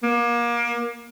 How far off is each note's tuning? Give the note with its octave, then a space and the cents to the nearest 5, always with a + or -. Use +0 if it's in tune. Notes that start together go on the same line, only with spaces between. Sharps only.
A#3 +30